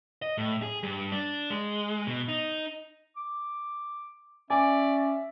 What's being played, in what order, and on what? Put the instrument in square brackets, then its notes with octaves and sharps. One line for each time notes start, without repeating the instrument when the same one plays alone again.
[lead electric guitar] D#5
A2
G#4
G2
D4
G#3
B2
D#4
[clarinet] D6
[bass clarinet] C#4 [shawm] D5 [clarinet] E5 [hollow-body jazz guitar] G#5